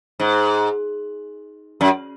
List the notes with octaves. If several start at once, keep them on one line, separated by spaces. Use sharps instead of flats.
G#2
F#2